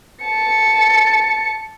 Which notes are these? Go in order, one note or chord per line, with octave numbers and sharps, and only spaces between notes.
A5 C#7